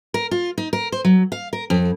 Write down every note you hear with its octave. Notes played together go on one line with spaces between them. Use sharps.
A#4
F4
D#4
A#4
C5
F#3
F5
A#4
F2